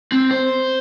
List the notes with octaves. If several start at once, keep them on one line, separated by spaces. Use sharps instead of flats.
C4
C5